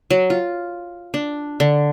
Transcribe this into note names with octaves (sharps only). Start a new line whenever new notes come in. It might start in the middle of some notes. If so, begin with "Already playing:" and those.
F#3
F4
D4
D3